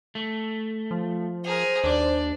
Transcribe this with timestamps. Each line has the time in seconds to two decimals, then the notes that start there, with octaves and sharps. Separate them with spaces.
0.15 A3
0.91 F3
1.45 G#4 A#4 C5
1.84 D#2 D4 D5